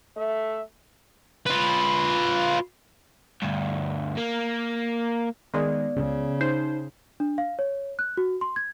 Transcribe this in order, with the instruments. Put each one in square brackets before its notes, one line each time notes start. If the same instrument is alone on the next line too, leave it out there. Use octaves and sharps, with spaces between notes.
[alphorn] A3 [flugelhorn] E5
[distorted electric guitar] F4 B4
[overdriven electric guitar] D2 G2
A#3
[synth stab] D#3 G#3 [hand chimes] B3 D5
[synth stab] C#2 [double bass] C#3
[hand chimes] D#4 [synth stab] C5
[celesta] D4
F5
C#5
F#6
F#4
C6
G#6